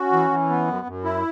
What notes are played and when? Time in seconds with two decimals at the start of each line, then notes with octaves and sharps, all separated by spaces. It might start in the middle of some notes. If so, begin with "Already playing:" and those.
Already playing: C#4 F#4
0.12 E3
0.30 E3
0.49 B3
0.68 F#2
0.86 F#2
1.04 E4